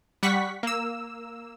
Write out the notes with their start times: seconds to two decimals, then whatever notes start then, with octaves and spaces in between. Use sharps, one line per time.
0.23 G3 F#5 C#6 B6
0.63 A#3 E6